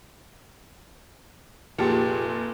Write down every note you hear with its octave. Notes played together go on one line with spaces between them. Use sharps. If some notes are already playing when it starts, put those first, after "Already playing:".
F1 A#2 F4 G4 G#4 A5